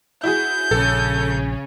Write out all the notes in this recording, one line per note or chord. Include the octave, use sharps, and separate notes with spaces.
E4 F#4 G#4 G6
A#1 C#3 C#4 A4